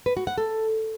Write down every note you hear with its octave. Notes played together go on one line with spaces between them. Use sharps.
B4
F#4
F#5
A4